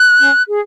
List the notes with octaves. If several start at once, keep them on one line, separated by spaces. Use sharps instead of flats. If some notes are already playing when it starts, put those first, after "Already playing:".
Already playing: F#6
C#4
G#4